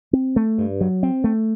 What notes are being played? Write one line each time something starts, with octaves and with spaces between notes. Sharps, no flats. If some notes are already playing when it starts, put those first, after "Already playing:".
C4
A3
G2
F#3
C4
A3